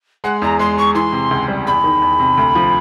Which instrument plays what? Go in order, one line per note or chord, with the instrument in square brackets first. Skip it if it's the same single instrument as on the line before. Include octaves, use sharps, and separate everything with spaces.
[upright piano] G#3 [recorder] F#5
[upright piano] E2 [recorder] A#5
[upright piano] G#3 [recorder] C6
[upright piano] G#3 [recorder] C#6
[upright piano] E3 [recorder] C6
[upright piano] C3
C#2
G3
[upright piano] E2 [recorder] B5
[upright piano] D#3
E2
C3
D2
F3